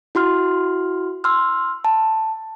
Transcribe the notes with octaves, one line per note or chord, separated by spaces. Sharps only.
E4 F#4 C6 F6
C6 E6 F6
A5